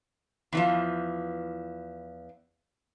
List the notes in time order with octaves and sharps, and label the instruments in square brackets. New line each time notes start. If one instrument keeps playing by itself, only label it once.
[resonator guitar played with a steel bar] E2 E3 F3